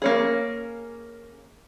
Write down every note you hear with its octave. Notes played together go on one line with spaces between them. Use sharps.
A#3 C#4 G#4